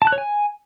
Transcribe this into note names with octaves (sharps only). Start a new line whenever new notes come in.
A5
F#6
C#5
G#5